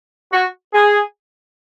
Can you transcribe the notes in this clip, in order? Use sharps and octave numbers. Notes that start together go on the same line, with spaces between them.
F#4
G#4